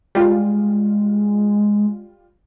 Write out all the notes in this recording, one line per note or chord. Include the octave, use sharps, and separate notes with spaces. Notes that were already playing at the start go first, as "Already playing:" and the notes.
G3 G#3 F4